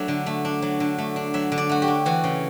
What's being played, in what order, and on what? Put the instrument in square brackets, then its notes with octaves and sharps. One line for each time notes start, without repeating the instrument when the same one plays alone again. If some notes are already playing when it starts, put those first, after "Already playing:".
Already playing: [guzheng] F#3 A3 D4 E5
D3
A3
D4
F#3
D3
A3
D4
F#3 E5
D3
D5
A3 F#4
G4
D4
E3 F#4
C#3